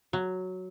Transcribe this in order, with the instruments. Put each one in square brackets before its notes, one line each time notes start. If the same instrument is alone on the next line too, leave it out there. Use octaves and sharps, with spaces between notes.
[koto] F#3